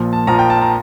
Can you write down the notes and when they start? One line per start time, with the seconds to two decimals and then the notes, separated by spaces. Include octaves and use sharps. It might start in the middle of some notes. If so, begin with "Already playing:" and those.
Already playing: A#1 A#2 F3
0.13 A5
0.27 A#1 A#2 F3 A#5
0.39 G5
0.50 A5
0.61 A#5